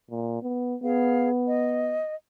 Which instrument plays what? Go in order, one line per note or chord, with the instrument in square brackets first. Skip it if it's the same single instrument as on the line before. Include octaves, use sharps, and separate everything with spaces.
[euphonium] A#2
B3
[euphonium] B3 [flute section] G#4 F5
[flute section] D#5